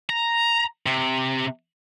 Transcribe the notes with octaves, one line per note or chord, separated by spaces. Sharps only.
A#5
C3